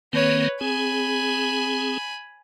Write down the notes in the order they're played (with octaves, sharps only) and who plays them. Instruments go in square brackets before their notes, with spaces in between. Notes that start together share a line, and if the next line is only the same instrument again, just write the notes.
[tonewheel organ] D#3 A#3 C4 [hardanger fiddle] B4 C#5
[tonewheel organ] C4 G#4 [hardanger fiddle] G#5 B5